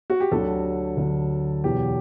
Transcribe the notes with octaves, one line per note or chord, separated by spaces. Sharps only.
F#4
G4
D2 D3 F#3 A4
D2 D3 F#3
E2 B2 F#3 G4